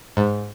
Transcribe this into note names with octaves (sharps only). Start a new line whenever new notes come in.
G#2